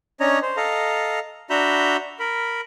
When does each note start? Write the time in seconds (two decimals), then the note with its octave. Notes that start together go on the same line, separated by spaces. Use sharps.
0.20 C#4 D4 C#5 D#5 A#5
0.42 C5
0.57 A4 D#5 F5 A#5
1.50 D4 F#4 E5 A#5 B5 G6
2.19 A#4 B5